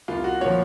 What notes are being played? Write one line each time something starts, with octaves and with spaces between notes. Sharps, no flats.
C2 F4
F#4
A#2 F3 C#5